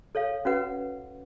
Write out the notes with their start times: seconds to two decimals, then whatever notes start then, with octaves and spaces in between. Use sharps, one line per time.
0.15 A4 C#5 F5
0.45 C#4 F#4 B4 F#5